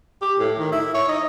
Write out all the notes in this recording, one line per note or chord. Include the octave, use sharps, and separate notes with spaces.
G4
A2
D#3
E4
C#5
D#4